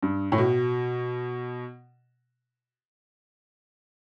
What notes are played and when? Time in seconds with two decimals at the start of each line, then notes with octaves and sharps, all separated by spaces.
0.02 G2
0.32 A2
0.38 B2